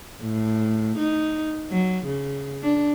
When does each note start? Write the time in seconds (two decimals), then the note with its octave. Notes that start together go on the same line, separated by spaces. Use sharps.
0.21 A2
0.98 D#4
1.70 F#3
2.06 C#3
2.62 D4